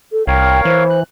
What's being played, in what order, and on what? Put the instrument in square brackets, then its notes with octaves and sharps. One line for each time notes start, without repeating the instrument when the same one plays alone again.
[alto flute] A4
[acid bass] C2 [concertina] A#4 C#5 F5 [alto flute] G5
[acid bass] E3 [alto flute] C5
[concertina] F#6